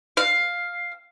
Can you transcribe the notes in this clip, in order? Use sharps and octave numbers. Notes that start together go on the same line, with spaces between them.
F5